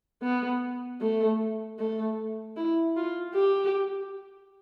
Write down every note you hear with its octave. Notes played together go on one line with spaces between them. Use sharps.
B3
A3
A3
E4
F4
G4